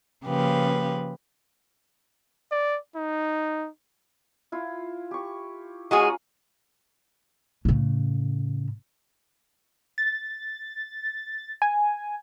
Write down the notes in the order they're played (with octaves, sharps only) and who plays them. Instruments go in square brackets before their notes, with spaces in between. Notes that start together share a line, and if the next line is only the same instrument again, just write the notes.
[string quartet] C#3 F3 A#3 G4 B4
[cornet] D5
D#4
[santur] E4 F4
G4 C#6
[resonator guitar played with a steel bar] G#3 F#4 G#4 [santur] C#4 F4 A#5
[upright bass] A2 C#3
[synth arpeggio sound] A6
G#5